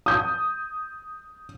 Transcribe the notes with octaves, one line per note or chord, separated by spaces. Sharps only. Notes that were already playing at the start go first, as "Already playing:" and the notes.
D#6 G6